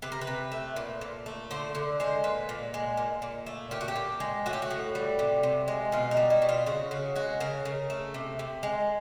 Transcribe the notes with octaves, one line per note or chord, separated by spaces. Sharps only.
C3 B4
A#4
B4
C3
A3
A#2
A#2
A3
D3 C5
D3
G#3 C5
A#2 B4
A#2
G#3
A#2
A#2
A3
A#2 G4
F#4
G4
A#2
G#3
A2 F#4
G4
F#4
A2
G3
C3
C3
G#3
B2 F4
D#4
G3
E4
B2
F4
C#3 F#4
C#3 F#4
G#3 F#4
C#3 A#4
C#3
A3
C3
C3
G#3